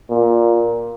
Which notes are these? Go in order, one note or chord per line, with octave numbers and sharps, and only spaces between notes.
A#2